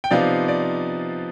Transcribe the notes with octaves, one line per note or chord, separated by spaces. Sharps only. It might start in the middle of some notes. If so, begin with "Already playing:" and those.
G5
C3 F3 B3 D#4 D5 F5
D5